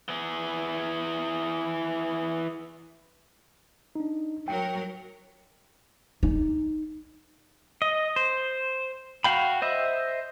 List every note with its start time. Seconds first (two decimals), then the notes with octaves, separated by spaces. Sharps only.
0.09 E3 G#4
3.95 D4 D#4
4.48 F#3 A#4 G5
6.23 D#4
7.82 D#5
8.16 C5
9.24 F#4 F5 G5 B5
9.62 C5 D#5 E5